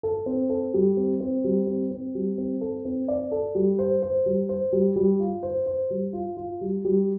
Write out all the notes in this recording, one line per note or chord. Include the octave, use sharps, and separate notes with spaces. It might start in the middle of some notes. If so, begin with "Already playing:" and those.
A4
C4
A4
G3
C4
C4
G3
C4
C4
G3
C4
A4
C4
D5
A4
G3
C5
C5
G3
C5
G3
G3
F4
C5
C5
G3
F4
F4
G3
G3